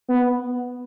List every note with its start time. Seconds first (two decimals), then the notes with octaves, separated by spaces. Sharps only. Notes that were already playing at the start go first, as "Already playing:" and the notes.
0.08 B3